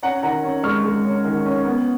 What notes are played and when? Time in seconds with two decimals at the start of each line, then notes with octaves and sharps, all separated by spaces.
0.02 C#4 F#5 A#5
0.23 D#3 F#5 A#5
0.43 C#4
0.63 G#3 C#6 F6
0.85 G#3
1.05 C#4
1.25 D#3
1.46 C#4
1.65 B3